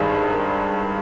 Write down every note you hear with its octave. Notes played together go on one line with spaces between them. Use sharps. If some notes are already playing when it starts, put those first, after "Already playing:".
Already playing: G#1 G2 D#3 G#4
A#4